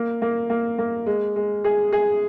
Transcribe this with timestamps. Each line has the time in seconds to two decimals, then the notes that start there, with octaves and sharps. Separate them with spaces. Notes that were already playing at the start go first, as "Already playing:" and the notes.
Already playing: A#3
0.22 A#3
0.50 A#3
0.78 A#3
1.06 G#3
1.36 G#3
1.64 G#4
1.92 G#4